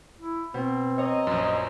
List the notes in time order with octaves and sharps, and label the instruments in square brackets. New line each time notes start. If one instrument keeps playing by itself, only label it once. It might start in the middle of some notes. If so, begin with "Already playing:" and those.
[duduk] E4
[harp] B2 [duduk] C4
[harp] C#5 A#5 [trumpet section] D#5
[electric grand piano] A#1 F#2